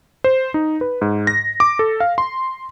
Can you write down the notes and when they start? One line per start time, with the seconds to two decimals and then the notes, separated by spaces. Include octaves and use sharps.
0.24 C5
0.54 D#4
0.81 B4
1.01 G#2
1.27 A#6
1.60 D6
1.79 A4
2.00 F5
2.18 C6